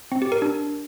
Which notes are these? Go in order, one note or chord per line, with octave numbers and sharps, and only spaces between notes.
C4
G4
A#4
D4